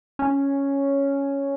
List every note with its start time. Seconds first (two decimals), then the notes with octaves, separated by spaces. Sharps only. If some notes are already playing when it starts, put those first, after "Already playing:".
0.19 C#4